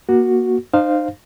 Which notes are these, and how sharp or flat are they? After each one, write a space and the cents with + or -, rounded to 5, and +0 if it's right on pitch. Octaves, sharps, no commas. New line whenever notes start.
A#3 +25 F#4 +0
D#4 -35 C5 +0 F5 +0